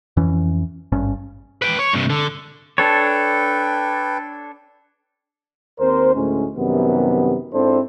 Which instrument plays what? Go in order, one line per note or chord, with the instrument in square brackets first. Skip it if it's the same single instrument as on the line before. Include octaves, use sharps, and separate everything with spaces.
[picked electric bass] F2 E3 C#4
G#1 G2 C#4
[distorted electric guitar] B4 G5
C#5
G2 C3
D3
[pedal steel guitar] D4 A4 C#5 [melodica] B4 G5
[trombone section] D#2 C4 A#4 C5
D2 A2 G#3 C#4
F#2 C3 D#3 G3 B3
G#2 C4 D4 E4 A4 C5